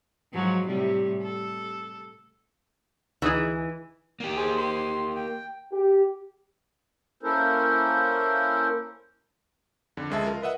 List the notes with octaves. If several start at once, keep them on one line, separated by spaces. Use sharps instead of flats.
G#2 F3 F#3
A2 C3 G3
A4
D2 E3 D#4 G#4
A#3 G4
G#4 C5
C6
G5
G4
A#3 C#4 E4 A4 A#4 C5
F2 D3
C#2 F3 G#3 A4 E5 A5
F4 A#4
B4 D#5 E5 F#5